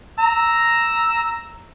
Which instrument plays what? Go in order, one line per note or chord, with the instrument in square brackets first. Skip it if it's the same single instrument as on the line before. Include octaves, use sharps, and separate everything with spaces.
[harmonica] A#5 E6